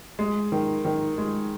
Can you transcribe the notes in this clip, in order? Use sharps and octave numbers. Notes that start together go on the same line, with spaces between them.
G#3
D#3
D#3
G#3